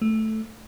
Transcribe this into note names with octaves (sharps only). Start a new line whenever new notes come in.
A3